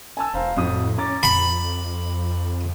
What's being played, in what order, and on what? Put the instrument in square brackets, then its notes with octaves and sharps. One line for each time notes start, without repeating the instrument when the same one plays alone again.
[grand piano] G#5 A5 E6
[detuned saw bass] E1 [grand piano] C5 F5 A#5
[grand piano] F2 F#4 D#6 [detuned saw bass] A2
[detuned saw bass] C#4 [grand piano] A#5 D6 A6
[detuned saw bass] F2 [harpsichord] B5